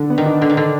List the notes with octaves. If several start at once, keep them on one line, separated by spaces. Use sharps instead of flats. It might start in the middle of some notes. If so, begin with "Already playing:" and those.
Already playing: D3
B3
D#3
D4
D3 D4
D#3
D3 D4